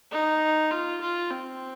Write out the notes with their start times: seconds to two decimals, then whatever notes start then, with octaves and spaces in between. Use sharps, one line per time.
0.12 D#4
0.71 F4
1.01 F4
1.31 C4